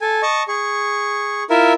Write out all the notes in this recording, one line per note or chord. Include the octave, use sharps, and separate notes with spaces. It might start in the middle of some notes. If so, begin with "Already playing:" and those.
A4 G#5
D#5 A5 C#6
G#4 C#6
E4 F4 A#4 E5